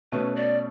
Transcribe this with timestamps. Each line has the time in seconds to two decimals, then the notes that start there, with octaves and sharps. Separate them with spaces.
0.12 B2 A3 C#4 B4
0.36 D5